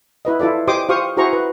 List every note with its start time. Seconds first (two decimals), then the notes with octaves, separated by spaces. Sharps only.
0.25 E4 B4 D#5
0.40 E4 F4 A4 D5
0.67 G4 C5 D#5 C6 D6 D#6
0.89 F4 G4 C5 F5 C#6 D#6
1.17 E4 F#4 G#4 C5 A#5 C#6
1.33 B4